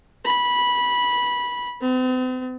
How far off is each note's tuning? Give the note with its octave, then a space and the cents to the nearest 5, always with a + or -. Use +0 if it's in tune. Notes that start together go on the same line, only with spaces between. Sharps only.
B5 -15
C4 -45